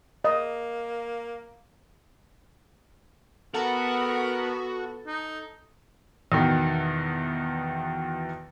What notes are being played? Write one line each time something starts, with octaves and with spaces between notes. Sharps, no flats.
A#3 D#5
B3 F#4 A4 A#4
D#4
E2 B2 D#3